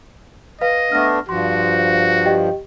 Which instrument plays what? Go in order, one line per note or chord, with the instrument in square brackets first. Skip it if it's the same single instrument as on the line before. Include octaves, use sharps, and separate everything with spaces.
[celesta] B4 F5 [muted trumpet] D#5
[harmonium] A3 B3 D4 [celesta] F6 A#6
[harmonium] G2 F3 [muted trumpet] F#4 [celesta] C6
[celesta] G4 D#5 G5